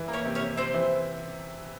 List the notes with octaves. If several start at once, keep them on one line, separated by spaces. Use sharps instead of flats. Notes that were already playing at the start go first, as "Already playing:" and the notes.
Already playing: E3
A#3
C#4 C#5
C3
C#4 C#5
C3
C3 C4 C5
E3